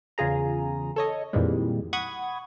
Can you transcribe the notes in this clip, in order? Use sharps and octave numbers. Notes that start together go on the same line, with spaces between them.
E2 C#3 F4 G#4 A#5
A4 C#5 D#5
F2 A#2 D#3 E3 G3 G#3
F#5 B5 C#6 D#6 G#6